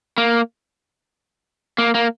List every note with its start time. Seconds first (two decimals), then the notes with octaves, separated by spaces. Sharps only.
0.18 A#3
1.78 A#3
1.95 A#3